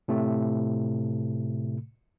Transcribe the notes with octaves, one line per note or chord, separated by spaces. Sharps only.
A2 C3 A3